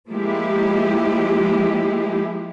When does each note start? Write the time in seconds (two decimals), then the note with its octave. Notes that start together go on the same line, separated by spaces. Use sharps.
0.11 F3 G#3 A#3 E4 G4